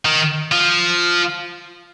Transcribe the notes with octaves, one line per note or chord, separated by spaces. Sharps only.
D#3
F3